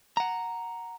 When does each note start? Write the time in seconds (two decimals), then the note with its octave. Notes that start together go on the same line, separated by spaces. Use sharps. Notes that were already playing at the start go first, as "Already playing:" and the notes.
0.17 F#5 A#5